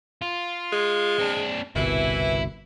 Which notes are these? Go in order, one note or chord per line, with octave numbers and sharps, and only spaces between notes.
F4
G#3
C4 D4
G1 C2 B2 E3 E4